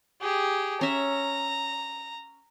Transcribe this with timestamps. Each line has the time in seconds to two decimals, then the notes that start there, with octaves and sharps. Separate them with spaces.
0.21 G4 G#4
0.81 C#4 E5 A#5